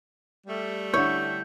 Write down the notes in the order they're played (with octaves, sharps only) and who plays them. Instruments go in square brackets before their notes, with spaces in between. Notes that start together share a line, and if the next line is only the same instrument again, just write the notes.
[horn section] G3 A3
[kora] D3 E4 [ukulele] C#5 [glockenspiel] G6